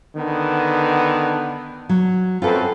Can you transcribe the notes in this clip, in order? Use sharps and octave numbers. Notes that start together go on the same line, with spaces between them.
D3 D#3 B3
F#3
F#2 C4 F4 A4 B4